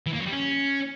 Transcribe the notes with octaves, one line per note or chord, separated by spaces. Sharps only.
E3
A#3
F#3
G3
C#4